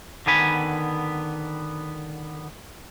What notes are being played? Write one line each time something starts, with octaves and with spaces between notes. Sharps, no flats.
D3 D#3 B3 G#5 B5